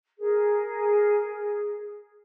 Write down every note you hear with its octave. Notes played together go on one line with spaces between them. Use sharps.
G#4 A#4